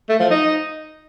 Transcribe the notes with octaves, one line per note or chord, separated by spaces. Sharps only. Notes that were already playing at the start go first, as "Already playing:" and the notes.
A3
F3
D#4